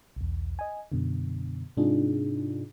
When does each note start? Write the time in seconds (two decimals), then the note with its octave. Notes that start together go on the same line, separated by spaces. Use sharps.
0.16 B1 E2
0.59 D#5 G#5
0.92 F#2 B2 D3
1.77 G#2 C3 D4 D#4 F4 G#4